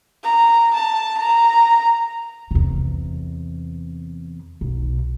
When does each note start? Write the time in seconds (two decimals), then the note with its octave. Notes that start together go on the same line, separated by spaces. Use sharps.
0.23 A#5
0.74 A5
1.18 A#5
2.51 E2 C3
4.61 B1